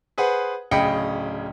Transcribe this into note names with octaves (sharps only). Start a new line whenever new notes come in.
G#4 B4 C5 F#5
D1 C#3 D#5 G5 B5 C#7